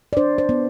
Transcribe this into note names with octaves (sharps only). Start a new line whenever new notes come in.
D5
D4 C5
C5
B3